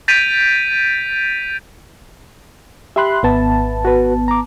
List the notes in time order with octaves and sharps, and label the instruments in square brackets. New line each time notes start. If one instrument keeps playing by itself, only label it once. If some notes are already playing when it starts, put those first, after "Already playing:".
[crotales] G6 A6 B6 D7 D#7 F7
[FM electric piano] G4 C6 F#6 [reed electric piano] E5 B5
[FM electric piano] G#1 B3 A5
[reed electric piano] F#4 B4
A#5 D6